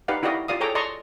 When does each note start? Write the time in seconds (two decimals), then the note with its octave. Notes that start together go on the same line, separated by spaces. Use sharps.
0.08 D#4 G4 B4 D5 F5 F#5
0.23 E4 F#4 G4 D5 D#5 F5
0.48 F4 G4 D5 F5 D#6
0.60 G#4 A4 C#5 G5 A#5 D6
0.75 D5 D#5 A5 A#5 C6 C#6